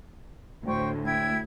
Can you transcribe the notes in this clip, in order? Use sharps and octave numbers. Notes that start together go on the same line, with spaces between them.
D2 A2 C5 G5 C#6
E4 G5 G#6